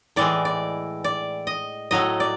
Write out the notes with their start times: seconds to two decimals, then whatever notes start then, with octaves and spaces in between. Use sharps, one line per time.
0.16 A2 E3 G#3 D5
0.45 D5
1.04 D5
1.47 D#5
1.91 A2 F#3 A3 D#5
2.20 D5